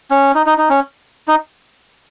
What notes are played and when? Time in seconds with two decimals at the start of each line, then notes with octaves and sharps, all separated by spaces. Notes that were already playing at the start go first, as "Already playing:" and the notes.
0.11 C#4
0.35 D#4
0.46 D#4
0.58 D#4
0.70 C#4
1.28 D#4